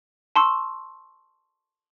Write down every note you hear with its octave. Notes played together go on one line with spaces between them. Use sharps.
A5 C6 C#6 E6